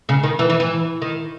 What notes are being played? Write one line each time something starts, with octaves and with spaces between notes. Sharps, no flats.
C#3
D#3
E3
E3
E3
D#3